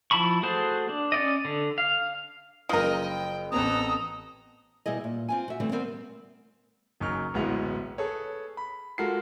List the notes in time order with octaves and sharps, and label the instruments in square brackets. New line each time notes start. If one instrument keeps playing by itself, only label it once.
[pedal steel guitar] F3 E4 A5 B5 C#6
A3 F#4 G#4 C5 A5
D4
C#4 D5 D#5
D3
F5
[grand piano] F#1 B4 D#6 [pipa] F3 A#4 [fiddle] D#5 G5
[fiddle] G5
[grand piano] A1 B3 C4 [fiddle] A4 A#5 [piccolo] D#6
[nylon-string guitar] B2 G3 E4 G#4 D#5
A#2
C4 F4 G#5
F#4 E5
D3 E3 G3 A3 C4
G3 B3 C4 A#4 C5
[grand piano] F#1 F#2 D#4 C#6 F6
D1 A1 G#3 B3 E4 F7
G#4 A4 B4 C#5
B5
G#3 F4 F#4 A4 A#4 C7